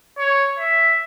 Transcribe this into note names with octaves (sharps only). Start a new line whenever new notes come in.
C#5
E5